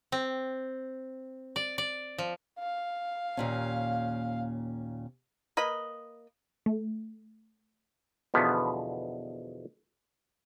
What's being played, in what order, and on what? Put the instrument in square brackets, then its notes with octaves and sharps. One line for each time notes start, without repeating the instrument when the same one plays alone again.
[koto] C4
D5
D5
F3
[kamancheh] F5
[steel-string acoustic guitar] D#2 A#2 C#4
[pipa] A#3 B4 D#5 B5
[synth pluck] A3
[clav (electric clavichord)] E2 B2 D3 F3 B3 C#4